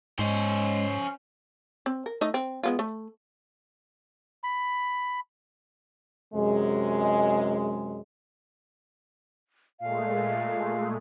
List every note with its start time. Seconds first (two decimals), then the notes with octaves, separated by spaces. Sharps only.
0.19 G#2 G#3 C#4 C5
1.86 C4
2.06 A#4
2.21 A3 D#4 D#5
2.34 C4
2.63 G#3 B3 F4
2.79 A3
4.43 B5
6.33 F#2 C3 G#3
9.80 A#2 G#3 A3 F5